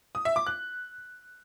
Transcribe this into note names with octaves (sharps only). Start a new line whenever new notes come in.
D#6
E5
D6
F#6